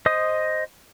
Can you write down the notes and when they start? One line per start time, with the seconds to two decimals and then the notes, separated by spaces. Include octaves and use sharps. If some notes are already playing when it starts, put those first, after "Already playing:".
0.06 C5 D#5 D#6